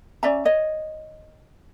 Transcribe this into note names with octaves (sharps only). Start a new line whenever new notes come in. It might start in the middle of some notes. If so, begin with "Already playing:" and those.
C#4 D5 E5 A#5
C#5 D#5